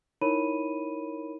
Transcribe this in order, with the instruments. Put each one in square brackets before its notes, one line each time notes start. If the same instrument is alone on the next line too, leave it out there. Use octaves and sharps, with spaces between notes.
[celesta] D#4 E4 A#4 C#5 B5 D#7